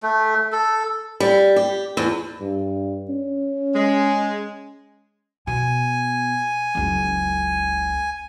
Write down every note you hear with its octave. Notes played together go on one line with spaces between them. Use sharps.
A3
A4
G3
G4
E2
G2
C#4
G#3
B2 G#5
F#1 C#2